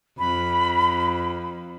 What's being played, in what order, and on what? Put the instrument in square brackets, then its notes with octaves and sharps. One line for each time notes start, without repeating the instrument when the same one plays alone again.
[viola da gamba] F2 [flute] B5